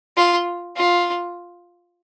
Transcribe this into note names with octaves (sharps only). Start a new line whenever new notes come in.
F4
F4